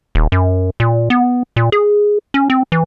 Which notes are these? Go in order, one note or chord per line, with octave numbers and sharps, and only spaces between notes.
D#1
F#2
A#2
B3
A#2
G#4
C#4
C4
E3